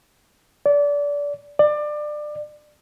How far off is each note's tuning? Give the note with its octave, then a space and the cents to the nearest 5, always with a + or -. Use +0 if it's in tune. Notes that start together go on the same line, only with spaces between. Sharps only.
D5 -25
D5 +25